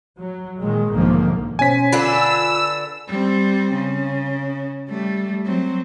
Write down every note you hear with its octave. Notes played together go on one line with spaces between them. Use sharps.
F#3
A#2 D#3 G#3
B1 G#2 D3 D#3 F3 A#3
B2 C#4 C5 G#5 B6
D3 D4 F4 B4 E6
G3 C4
C#3
G3 A3
F#3 C4